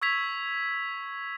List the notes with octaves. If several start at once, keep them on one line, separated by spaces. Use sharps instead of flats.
C#6 E6 G#6 B6 F7